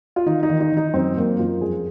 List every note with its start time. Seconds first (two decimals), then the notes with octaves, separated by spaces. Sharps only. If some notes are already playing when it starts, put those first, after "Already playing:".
0.16 F4
0.26 D#3 D#4
0.43 D#4
0.50 D#3
0.60 D#4
0.72 D#3 D#4
0.94 F#2 C4
1.17 F#2 A#3
1.39 F#2 F4
1.61 F2 G#4